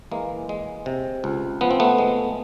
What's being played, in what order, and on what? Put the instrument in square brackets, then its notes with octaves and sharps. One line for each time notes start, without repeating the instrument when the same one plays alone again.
[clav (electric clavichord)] E3 G#3 A#3
G#3
C3
C#2
F3 B3
C4
A3 B3
G#3